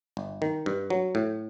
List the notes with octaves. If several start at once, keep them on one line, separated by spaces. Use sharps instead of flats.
G1
D#3
G2
F#3
A2